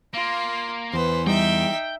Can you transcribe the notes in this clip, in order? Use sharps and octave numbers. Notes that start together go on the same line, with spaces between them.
A#3 F4
E2 B4 C5
G3 D#4 E5 G5